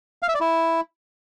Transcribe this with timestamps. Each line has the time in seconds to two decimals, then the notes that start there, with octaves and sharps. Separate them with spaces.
0.23 F5
0.29 E5
0.35 D5
0.41 E4